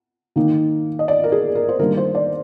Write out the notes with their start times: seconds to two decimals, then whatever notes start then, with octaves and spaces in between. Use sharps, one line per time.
0.36 D#3 A#3 D#4
0.99 D#5
1.08 D5
1.24 A#4
1.32 G#4
1.55 A#4
1.69 C5
1.79 D#3 G3 A#3 D4 A#4
1.97 C5
2.15 D5